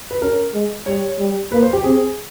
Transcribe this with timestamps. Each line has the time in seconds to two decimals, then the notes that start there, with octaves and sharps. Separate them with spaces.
0.11 B4
0.22 C#4 A#4
0.54 G#3
0.86 G3 C#5
1.19 G3
1.52 A#3 B4
1.62 C5
1.73 G4
1.84 C4 G#4